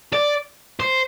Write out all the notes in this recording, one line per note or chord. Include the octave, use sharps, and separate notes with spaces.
D5
C5